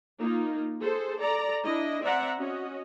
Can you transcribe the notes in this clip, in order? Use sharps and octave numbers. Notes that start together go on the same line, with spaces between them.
A#3 D#4 F4
G#4 A4 C5
A4 D5 A#5
D4 E4 D#5
C4 D5 E5 F#5 A#5
C#4 F#4 D#5